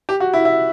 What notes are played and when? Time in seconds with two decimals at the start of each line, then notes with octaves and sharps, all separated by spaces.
0.09 G4
0.20 F#4
0.33 E4
0.45 E4